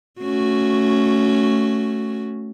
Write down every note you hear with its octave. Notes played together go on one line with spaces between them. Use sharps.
A3 C#4 F#4